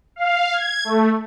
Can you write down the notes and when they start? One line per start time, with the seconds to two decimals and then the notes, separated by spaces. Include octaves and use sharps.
0.16 F5
0.53 G#6
0.85 A3